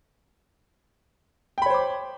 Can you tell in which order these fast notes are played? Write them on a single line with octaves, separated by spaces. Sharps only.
G5 B5 C#5 C5 D6